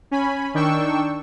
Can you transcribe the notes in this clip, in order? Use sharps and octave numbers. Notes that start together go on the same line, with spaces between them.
C#4 G#5 B5
D#3 D4 G5 C#6 E6